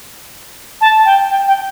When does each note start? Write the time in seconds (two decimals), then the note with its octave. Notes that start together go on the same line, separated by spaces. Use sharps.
0.81 A5
1.05 G5
1.31 G5
1.47 G5